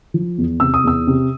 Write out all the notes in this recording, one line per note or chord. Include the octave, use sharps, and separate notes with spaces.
F3
E2
C3 E6
D#6
E2 E6
C3